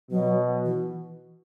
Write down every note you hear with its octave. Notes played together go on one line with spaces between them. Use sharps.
B2 F#3
E3